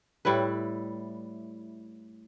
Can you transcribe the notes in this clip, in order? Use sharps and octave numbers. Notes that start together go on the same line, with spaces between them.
A2 G3 E4 B4